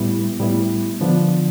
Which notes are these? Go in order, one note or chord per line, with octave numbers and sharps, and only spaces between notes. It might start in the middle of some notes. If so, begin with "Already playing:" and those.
Already playing: A2 G3 B3 E4
A2 G3 B3 E4
D3 F3 B3 D4